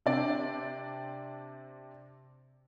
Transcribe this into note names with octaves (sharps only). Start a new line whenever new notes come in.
C3 C4 D4 D5